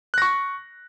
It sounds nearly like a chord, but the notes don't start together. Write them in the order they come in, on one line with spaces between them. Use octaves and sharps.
F#6 A#6 C#6